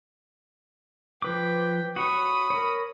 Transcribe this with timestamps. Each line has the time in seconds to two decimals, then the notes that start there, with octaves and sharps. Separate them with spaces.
1.22 F3 B4 G5 D6
1.96 F#4 C#5 B5 C#6 D#6
2.50 A#4 C#5